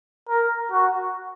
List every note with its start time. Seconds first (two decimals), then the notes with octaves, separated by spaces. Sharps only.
0.29 A#4
0.71 F#4